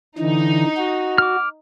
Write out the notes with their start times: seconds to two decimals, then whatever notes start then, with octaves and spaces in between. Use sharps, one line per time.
0.19 D3 E3 D#4
0.77 F#4
1.18 D6 F6